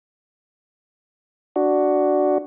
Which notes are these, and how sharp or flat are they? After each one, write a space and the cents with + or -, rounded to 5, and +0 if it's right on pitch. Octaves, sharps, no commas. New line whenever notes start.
D4 +0 F#4 +5